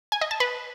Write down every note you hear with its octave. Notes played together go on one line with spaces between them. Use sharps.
G#5
D#5
A5
B4